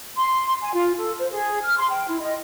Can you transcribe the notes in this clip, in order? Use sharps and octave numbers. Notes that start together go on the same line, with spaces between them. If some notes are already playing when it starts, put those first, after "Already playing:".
C6
G#5
F4
A4
C5
G#4
F6
C6
G5
E4
D#5